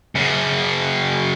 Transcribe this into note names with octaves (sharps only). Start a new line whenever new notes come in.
F#2 C#3